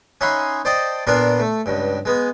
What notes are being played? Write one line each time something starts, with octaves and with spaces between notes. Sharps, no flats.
C#4 D#4 E5 F#5 B5 C6
C5 D5 D#5 G5 A5
A#2 B3 D4 A#4 C6
A3
C#2 G2
G#3 B3